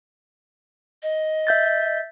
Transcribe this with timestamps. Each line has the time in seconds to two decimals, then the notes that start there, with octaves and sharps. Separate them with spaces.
1.02 D#5
1.47 E5 G6 A6